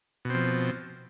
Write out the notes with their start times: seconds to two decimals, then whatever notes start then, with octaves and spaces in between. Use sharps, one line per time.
0.25 B2
0.30 C4
0.35 F3